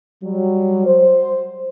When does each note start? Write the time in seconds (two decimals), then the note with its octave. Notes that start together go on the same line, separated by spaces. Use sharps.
0.24 F#3 G3
0.86 C5